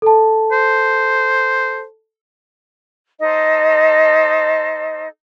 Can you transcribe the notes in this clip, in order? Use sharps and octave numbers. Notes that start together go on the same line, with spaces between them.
A4 A5
C5
D#4 A4 C5 D#5